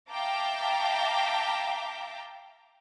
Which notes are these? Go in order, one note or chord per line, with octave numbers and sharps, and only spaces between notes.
E5 F5 G5 A5 A#5 D6